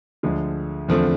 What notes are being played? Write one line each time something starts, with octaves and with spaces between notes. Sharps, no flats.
D2 D3 F3 G#3
E2 D3 F3 A3 C4